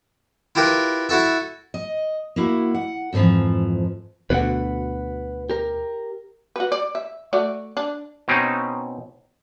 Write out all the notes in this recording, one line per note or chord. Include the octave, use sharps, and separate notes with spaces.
E4 F4 G4 A#4 B4
E4 F#4 A4 E5
D#5
A#3 E4 F#4
F#5
F2 G#2 D3 E3 F3
D2 B2 B4 F#5
G4 A#4
F#4 B4
D5
E5
A3 F#4 D5
D4
B2 C4 C#4 D#4